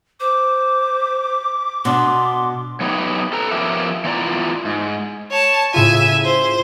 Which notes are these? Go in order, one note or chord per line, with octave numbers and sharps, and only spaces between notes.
C5 D6
B2 D4 C6
F#3 A3 B3 D#4 G4 C#5
A4 B4 A#5
F3 B3 C#4 G4 A#4 E5
E3 B3 F4 D5 A#5
G#2
C#5 A5
A2 C#3 F4 E5 G#5
C5